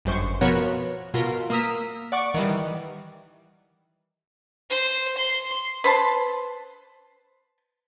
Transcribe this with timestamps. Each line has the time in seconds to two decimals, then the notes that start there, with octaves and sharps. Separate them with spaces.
0.05 G1 F#2 C5 C#6
0.41 B2 F3 B3 F#4 A#4 C#5
1.14 B2 F4 A#4
1.50 A#3 A#5 D#6 E6 B6
2.12 D5 F#5 C#6 D6
2.34 D#3 E3 G3
4.70 C5
5.18 C6
5.84 B4 C5 A5